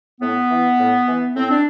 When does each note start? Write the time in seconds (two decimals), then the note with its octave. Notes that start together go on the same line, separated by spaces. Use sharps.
0.21 A2 B3
0.50 E3
0.77 A2
1.07 E3
1.35 A2 C4
1.50 D4